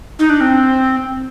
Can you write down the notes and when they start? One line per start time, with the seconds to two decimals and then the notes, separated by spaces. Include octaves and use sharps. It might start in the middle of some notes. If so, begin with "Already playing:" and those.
0.19 D#4
0.30 D4
0.41 C4